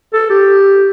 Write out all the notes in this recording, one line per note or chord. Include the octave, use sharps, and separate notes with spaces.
A4
G4